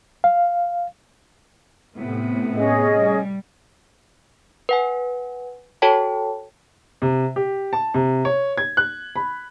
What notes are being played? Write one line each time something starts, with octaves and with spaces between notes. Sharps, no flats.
F5
A2 C3 B3
C#4 G#4 D#5
G3
B4 F#5 G#5
F#4 A4 C#5 G5 A5
C3
G4
A5
C3
C#5
G#6
F#6
B5